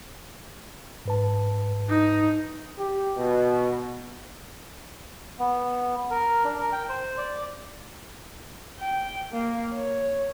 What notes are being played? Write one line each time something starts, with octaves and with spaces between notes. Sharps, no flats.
G#2 B4 A5
D#4
G4
B2
B3
A#4
D4
A#4
G5
C5
D5
G5
A#3
C#5